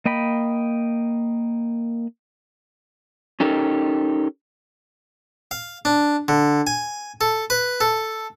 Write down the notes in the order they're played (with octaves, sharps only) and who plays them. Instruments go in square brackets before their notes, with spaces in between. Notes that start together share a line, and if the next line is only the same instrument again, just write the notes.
[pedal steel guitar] A#3 D#5 G5 B5
[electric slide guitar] C#4 D#4 G4 A4 A#4
[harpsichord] F5
D4
D3
G#5
A4
B4
A4